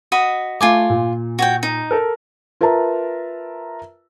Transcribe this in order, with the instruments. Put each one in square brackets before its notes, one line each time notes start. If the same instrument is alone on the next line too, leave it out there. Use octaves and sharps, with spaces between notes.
[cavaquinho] F#4 D#5 B5
[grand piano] A3 [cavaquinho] F4 G#5 D6
[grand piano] A#2
[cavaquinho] F#4 C#5 G5
D#4
[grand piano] A4 A#4
[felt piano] F4 A#4 B4 E5 A5 A#5